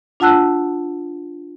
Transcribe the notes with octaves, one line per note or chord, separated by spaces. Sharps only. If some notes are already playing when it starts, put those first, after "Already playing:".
D4 F4 F#5 A5 E6 F#6